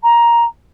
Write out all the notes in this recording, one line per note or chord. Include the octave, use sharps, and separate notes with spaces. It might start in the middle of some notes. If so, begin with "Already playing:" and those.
A#5